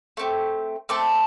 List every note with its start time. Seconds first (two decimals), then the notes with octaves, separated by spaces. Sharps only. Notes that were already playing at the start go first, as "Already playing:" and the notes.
0.17 A3 C4 G4
0.89 A3 C4 A4 D6